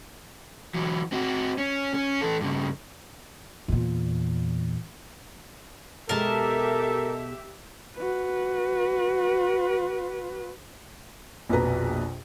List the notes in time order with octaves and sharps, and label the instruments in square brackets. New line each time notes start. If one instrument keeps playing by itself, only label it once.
[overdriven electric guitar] E3 F#3
C4 F#4
C#4
C#4
E3 A4
G2 C#3
[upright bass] E2 A#2
[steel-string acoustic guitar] B2 G#3 [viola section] G4 E5 [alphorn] A4 [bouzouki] A#4 A5
[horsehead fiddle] F#4 B4
[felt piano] A#1 F2 B2 B4 A#5